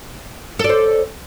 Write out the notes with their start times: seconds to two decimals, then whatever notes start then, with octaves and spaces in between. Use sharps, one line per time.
0.59 A4
0.64 D5
0.69 C5